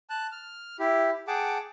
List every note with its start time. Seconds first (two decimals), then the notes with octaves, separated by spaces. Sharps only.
0.10 A5 F#6
0.32 F6
0.79 E4 G4
1.28 G#4 F#5 G5 A5 D6